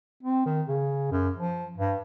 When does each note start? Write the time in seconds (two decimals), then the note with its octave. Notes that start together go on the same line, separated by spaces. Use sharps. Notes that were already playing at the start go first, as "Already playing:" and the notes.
0.23 C4
0.46 D#3
0.68 C#3
1.11 F#2
1.37 F3
1.78 G2